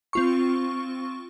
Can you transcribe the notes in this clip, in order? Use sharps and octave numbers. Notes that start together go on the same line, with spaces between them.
C4 F4 C#6